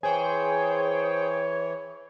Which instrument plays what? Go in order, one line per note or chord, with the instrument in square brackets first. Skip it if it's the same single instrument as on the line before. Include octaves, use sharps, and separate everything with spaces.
[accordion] E3 [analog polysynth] G#4 C5 G5 [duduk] C#5 [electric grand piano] G#5